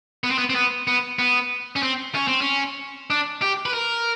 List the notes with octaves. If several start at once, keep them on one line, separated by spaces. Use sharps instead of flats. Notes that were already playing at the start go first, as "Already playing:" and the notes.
B3
C4
B3
C4
B3
B3
B3
C#4
C4
C#4
C4
C#4
D4
G4
B4
A#4